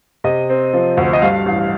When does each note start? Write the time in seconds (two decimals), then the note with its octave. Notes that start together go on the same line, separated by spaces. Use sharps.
0.24 C3 D#5
0.50 C4
0.74 F3
0.97 D2
1.13 D#5
1.22 G2 F5
1.46 A1